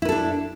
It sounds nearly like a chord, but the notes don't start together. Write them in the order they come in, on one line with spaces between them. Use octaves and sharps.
E4 B4 A4 D4